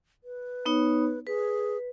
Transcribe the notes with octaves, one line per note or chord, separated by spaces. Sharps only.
B4
B3 D#4 C#5
G#4 B4